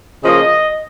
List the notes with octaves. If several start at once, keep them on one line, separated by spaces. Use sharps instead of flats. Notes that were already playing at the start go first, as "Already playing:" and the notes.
C#3 F3 A#3 D#5